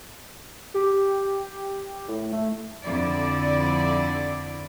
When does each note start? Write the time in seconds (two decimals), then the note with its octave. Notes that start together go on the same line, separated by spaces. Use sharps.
0.74 G4
2.08 A2
2.33 A3
2.84 F2 D3 E4 D5